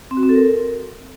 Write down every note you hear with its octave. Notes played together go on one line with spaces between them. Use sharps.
C4
F#4
C4
A4
A#4